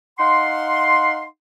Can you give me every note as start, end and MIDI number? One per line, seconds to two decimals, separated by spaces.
0.19 1.24 63
0.19 1.24 77
0.19 1.24 78
0.19 1.24 84